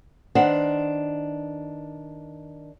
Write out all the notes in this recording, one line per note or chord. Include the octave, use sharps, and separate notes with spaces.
D#3 D4 B4 C5 F#5